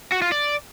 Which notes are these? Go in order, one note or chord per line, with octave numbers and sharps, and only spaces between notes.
F#4
F4
D5